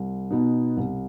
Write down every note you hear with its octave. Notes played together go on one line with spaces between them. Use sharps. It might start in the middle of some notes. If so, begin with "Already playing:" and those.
Already playing: C2
B2 B3 D#4
C2